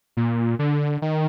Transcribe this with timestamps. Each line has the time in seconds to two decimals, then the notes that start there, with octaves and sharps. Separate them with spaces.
0.17 A#2
0.59 D3
1.02 D#3